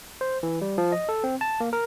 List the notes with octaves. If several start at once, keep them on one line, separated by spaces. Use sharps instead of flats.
C5
E3
G3
F3
D#5
A4
C4
A5
A#3
A#4